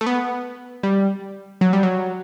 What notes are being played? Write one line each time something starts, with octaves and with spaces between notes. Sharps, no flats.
A3
B3
G3
F#3
G3
F#3